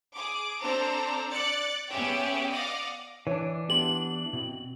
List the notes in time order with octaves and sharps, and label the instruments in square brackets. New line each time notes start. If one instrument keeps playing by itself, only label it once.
[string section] G#4 D6
C4 D4 A4 C5 A#5
D5 F#6 A6 C#7
B3 C#4 G4 G#4 E5 G5
D5 D#5 F5 F#5 D6
[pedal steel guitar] E3 D4 [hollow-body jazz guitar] C#5
[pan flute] B3 [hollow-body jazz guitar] G4 C6 [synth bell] F#7
[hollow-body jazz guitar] B2 [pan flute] C4